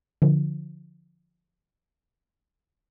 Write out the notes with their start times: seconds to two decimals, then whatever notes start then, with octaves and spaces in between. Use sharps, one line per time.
0.22 D3 F3